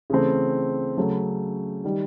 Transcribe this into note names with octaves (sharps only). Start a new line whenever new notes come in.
C#3 E3 A3 C4
C#3 F#3 A3 C#4
D#3 G3